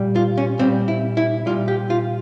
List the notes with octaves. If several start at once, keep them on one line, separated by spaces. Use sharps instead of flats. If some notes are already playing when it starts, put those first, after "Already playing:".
Already playing: A#2 G3
F4
C#4
A#2 G3 C4
E4
E4
A#2 G3 F4
G4
F4